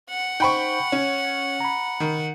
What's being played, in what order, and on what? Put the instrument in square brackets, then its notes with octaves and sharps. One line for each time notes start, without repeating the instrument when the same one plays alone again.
[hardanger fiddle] F#5
[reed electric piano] D#4 C5 [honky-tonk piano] G5 B5 C#6
[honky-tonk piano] C#4 [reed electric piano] C#5
[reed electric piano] A#5 B5
[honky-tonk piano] D#3